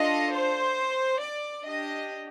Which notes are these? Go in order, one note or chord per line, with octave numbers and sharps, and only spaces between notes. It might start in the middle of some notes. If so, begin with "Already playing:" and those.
Already playing: D4 F4 A4 D#5
C5
D5
D4 G4 D#5